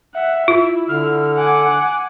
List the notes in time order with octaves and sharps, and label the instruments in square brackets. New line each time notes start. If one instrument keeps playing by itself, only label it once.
[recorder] E5 [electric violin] F#5
[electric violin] E4 [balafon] F4
[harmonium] D3 [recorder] F6
[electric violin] F#5 D6 [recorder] G#5